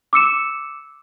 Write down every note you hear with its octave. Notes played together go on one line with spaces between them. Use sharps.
D6 E6 C#7 E7